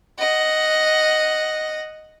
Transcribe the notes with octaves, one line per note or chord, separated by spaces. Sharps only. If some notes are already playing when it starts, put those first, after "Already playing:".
D#5 F#5